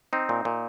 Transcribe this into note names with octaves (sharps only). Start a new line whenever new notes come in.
C4 D#4
A#2
A#2